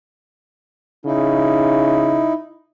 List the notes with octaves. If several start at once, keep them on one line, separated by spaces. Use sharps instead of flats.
C#3 D#4 E4